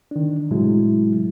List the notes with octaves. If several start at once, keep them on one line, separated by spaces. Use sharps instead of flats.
D#3 D4
A2 C3 F#3 G#3 E4